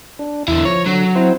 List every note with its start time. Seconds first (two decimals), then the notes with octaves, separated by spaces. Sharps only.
0.19 D4
0.48 E2 D3 E4
0.65 F3 C#5 A#5
0.86 D3 F#3
1.15 C4 E4 C5